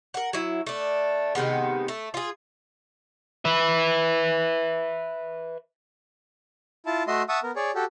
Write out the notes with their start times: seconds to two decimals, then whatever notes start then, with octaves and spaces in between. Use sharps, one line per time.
0.14 A#4 F#5
0.33 F#3 E4
0.66 A3 D4
1.35 C3 D#3 G#3 B3
1.88 A3
2.14 F4 G#4
3.45 B4 E5
6.86 E4 F4 A5
7.07 A3 F#4 D#5 E5 C6
7.29 E5 F#5 A5 C#6 D#6 E6
7.43 B3 A#4
7.56 G#4 C#5 D5
7.75 F#4 G4 A4